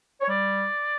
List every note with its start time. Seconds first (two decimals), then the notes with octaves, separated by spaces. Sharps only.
0.21 C#5
0.28 G3 D5